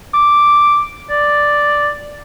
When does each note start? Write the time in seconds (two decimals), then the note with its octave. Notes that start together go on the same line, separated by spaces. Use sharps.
0.14 D6
1.10 D5